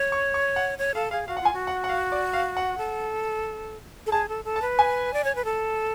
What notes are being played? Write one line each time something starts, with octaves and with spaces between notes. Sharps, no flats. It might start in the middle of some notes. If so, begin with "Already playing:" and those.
Already playing: C#5
C#6
C#6
F#5
C#5
A4 F5
G#4 F5
F#4 F5
F#5
F4 G#5
F#4
F#5
F#5
F5
D5
F5
F#5
A4
A4
G#4 A5
A4
A4
A5
B4
G#5
D5
C#5
B4
A4